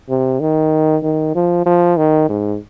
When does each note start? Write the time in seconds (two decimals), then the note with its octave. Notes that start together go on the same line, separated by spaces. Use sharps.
0.09 C3
0.40 D#3
1.03 D#3
1.35 F3
1.66 F3
1.97 D#3
2.29 G#2